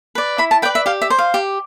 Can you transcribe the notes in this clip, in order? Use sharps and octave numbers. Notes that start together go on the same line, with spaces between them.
B4 D5
E4 B5
A5
B4 D5 G5
E5
G4 F5
E5
C5
F5
G4